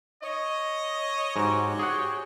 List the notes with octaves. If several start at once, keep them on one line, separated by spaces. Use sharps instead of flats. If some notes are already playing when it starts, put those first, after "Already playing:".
C#5 D#5
G#2 F#4 G4 C#5
G#4 F#5